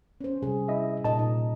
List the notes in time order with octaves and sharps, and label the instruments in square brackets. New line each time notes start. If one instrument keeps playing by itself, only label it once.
[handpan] C#4 C5
C3 G3 G#4
[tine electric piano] E4 D#5 E5
[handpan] A#2 D#4 D#5 [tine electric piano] A5
[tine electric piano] A#2 [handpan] D#4